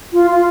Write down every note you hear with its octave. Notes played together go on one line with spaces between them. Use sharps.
F4
F4